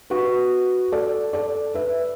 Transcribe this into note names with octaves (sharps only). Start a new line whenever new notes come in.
F#4 B4
A4 D5
A4 D5
B4 E5